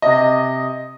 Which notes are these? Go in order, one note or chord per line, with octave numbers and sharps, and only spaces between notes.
C3 D#5